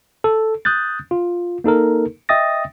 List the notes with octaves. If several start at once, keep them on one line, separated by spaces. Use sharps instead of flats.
A4
D#6 F#6 G6 A6
F4
A#3 D#4 A4 A#4
D#5 E5 G5 D#6 A6 A#6